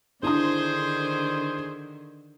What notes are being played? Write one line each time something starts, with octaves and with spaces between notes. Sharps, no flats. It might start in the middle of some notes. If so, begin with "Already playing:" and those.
D3 D#3 D4 E4 G#4 C5 D#6